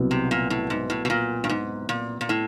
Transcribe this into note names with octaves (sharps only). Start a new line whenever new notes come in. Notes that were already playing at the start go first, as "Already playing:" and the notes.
Already playing: C2 B2 F#3
C3
A#2
A2
G#2
A2
B2
A#2
G2
G#2
A#2
A#2
A2